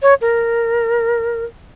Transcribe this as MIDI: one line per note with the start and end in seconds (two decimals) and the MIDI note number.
0.02 0.14 73
0.21 1.44 70